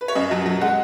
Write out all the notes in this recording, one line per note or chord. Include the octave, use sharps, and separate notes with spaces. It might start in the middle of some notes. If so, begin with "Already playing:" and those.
B4
C#5
F#2 D#5
F#3
F#3
G#3 F#5